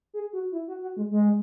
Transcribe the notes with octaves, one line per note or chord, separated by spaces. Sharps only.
G#4
F#4
E4
F#4
F#4
G#3
G#3